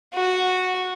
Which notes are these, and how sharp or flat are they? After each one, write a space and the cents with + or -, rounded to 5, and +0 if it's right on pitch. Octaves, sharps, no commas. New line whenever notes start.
F#4 -10